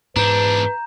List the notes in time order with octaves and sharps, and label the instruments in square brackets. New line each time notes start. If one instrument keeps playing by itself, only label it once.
[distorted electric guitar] E2 D4 [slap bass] G#2 [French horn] B4 [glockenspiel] A#5 G6